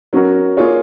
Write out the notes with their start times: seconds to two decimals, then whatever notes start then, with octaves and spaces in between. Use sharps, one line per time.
0.13 F#3 C#4 F#4 A#4
0.57 A#3 F4 G#4 C#5